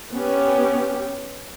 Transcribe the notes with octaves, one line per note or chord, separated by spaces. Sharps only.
B3 C#4 G4